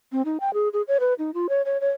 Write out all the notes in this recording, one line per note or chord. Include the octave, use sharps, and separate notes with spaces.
C4
D#4
G5
G#4
G#4
C#5
B4
D#4
F4
C#5
C#5
C#5